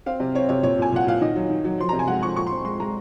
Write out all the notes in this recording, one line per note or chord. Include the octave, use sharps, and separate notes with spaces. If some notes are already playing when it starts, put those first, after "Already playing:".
C4 F5
C3
C4 C#5
C3 C#5
A#2 C#5
A#2 G#5
A#2 F#5
A#2 F5
D#3 D#5
F#3
D#3
F#3
F3 C6
C3 A#5
G#5
G#3 F#5
F3 C#6
A#2 C#6
C4 C6
G#3 C6
G#3 A#5